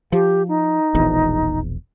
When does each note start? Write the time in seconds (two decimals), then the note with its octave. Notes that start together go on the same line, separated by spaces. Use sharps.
0.12 F3 G4
0.48 D#4
0.95 E1 A#1 E2